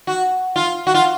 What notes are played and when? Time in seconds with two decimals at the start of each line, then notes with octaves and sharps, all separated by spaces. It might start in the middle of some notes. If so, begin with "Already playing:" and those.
0.07 F#4
0.56 F4
0.87 F#4
0.94 F4